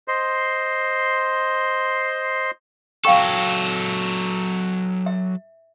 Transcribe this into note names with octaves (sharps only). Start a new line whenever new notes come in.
C5 D#5 C6
F#3 A4 F5 G5 C#6
E5